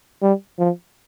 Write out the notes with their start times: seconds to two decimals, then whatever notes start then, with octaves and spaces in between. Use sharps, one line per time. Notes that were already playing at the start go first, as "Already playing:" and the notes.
0.22 G3
0.59 F3